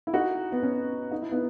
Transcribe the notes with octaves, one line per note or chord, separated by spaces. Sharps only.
E4
D#4 F#4
B3
C#4
D#4
E4
B3 D#4